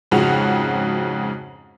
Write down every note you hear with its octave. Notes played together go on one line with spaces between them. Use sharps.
F2 G#2 C#3 F#4 F7